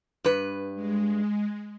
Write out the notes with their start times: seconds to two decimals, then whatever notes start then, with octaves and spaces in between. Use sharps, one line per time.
0.24 G2 B4
0.75 G#3